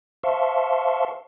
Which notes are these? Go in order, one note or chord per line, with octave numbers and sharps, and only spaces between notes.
C5 E5 F5 A5 C6 C#6